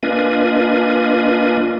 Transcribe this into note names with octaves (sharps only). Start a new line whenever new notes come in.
A#3 D4 F4 B4 D#5 G#5